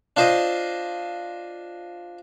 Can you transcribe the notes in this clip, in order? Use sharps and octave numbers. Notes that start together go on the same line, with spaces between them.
D4 F4 C5 D#5